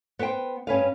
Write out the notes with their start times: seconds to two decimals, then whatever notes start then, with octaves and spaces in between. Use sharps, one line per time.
0.19 B3 B4 C5 G5
0.67 G2 C#4 B4 F5